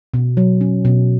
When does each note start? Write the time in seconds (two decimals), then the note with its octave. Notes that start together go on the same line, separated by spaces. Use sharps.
0.14 B2
0.37 F#3
0.61 C#4
0.85 B2